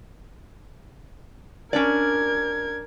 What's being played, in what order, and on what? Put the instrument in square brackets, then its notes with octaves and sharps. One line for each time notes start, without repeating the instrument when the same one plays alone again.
[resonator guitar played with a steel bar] C#4 D4 D5 [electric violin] A#4 G#6